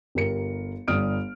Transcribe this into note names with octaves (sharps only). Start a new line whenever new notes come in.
G1 G4 A#4 C#7
G1 G3 D#6 F6 D7